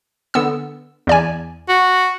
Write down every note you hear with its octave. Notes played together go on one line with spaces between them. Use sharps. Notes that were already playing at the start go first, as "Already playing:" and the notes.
D3 B3 E6
E2 D5 G#5
F#4